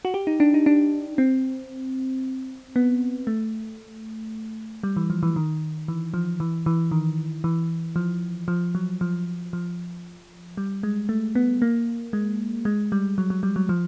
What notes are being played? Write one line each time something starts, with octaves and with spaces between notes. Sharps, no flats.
F#4
G4
D#4
D4
D#4
D4
C4
B3
A3
G3
E3
F3
E3
D#3
E3
F3
E3
E3
D#3
E3
F3
F3
F#3
F3
F3
G3
G#3
A3
B3
A#3
G#3
G#3
G3
F#3
F#3
G3
F#3
F3